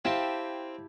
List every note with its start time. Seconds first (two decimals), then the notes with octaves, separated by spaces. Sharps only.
0.05 C4 E4 G4 F5 G5 A5